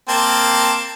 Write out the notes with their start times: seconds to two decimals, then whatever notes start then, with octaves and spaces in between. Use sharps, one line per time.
0.09 A#3 C4 A5